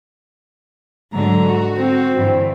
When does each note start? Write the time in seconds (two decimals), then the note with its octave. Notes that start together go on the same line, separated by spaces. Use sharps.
1.13 G#2 D3 F#3 A#5
1.49 F#4
1.77 C4
2.16 G2 D3 E3